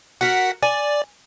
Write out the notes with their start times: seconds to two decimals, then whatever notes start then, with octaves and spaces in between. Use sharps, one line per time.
0.21 F#4 A#4 F#5 B6
0.63 D5 G#5